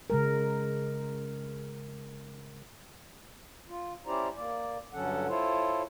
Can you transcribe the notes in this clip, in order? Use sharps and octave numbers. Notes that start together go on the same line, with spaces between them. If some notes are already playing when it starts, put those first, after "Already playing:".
C#3 G#3 A#4
F4
C#4 E4 G4 C5 D5 A#5
A#3 D5
G2 D3 F#3 C#4 A4 F#5
E4 F4 A4 C5 C#5